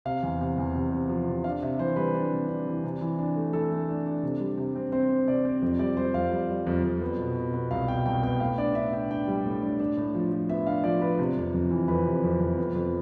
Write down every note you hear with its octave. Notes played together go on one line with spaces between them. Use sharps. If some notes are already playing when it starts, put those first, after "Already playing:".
C3 F5
E2
C3
E2
C3
C3
F3
C3
D4 F5
C3 E5
E3 C5
G3 B4
D4
C3
D4
E3
C3
E3
D4
A3
E3 A4
A3
D4
D4
C3
G3
C3
C4
C4 C5
C4
C3 D5
C4
F2
G3 D5
G3 C5
F2 F5
G3
G3
F2
F2
B3
B2
B2
B3
C2 F5
B2 G5
C2 G5
B3 G5
A2 F5
D4 D5
D4 E5
D4 G5
D4 G5
G3
A2
D4
D4
A2
F3
F3
B3 E5
D4 F5
F3 D5
F3 B4
C3
F2
F2
E3
F2 B4
C3
F2
F2
B3
F2